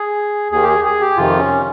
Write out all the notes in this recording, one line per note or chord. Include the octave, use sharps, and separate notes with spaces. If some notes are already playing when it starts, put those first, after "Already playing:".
Already playing: G#4
D#2 D#3 G#4
G4
G#4
G#4
G4
F2 C3 D#3 F4
C#4